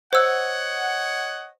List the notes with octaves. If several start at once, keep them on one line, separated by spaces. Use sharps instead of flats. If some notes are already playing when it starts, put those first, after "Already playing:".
C5 C#5 D#5 F#5 E6